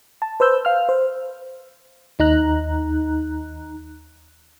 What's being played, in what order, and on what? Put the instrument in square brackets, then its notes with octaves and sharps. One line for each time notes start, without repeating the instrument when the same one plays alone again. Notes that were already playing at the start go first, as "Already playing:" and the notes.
[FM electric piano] A5
B4 C5 E6 G6
F5 F6
C5
D#2 D#4 A#5 F#6